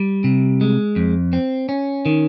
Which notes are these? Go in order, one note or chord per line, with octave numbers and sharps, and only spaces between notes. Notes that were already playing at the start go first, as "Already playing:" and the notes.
Already playing: G3
C3
G#3
F2
C4
C#4
D#3